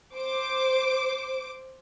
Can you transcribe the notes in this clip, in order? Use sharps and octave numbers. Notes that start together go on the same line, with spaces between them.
C5 D6